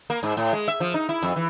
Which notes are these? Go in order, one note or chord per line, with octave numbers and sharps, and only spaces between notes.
A#3
G#2
A2
G#3
E5
F3
D#4
E4
F2
E3